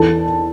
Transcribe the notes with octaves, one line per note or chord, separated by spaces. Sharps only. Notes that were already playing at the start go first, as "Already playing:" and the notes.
Already playing: E2 A4 A5